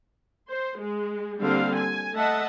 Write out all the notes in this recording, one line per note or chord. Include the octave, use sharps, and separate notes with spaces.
C5
G#3
D3 G3 A#3 C4 F5
G#5
A3 D#5 E5 F#5 A5